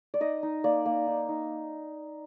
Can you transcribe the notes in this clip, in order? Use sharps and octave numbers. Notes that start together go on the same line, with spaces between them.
D5
D#4 D#5
D#4
A#3 D5
A#3
D#4
D#4